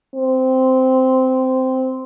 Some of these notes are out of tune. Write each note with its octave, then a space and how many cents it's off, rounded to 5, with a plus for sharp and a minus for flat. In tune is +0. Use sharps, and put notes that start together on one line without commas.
C4 -10